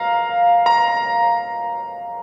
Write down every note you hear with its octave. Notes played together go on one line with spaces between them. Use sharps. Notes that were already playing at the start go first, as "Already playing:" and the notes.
Already playing: F5 A#5
A#5